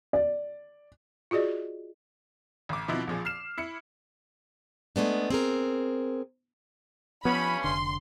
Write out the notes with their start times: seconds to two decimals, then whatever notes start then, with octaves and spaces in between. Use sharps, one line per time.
0.13 D5
1.31 F4 F#4 G#4 D5 D#5
2.69 A1 D6
2.88 B2 F3 C4 D#4 E4
3.07 A#1 F3 G#4
3.25 F6 C7 E7
3.58 E4 C#7
4.96 G#3 A3 B3 D4
5.30 C4 G#4 A#4
7.25 G2 F3 B3 C#4 B5
7.64 F1 D3 C6